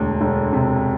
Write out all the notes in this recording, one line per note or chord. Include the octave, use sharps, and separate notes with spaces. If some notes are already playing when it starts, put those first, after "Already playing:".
Already playing: E1 D2
E1
C3